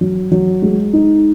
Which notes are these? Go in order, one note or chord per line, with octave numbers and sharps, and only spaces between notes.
F#3
F#3
G#3
D#4